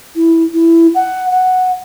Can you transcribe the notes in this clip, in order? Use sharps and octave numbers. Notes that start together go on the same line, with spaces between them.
E4
E4
F#5
F#5